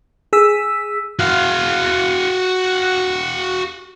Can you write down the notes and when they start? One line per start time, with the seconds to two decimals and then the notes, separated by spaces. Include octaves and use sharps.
0.33 G#4 E6 B6
1.19 F#4 F5